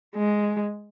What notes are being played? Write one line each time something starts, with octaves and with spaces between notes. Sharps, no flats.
G#3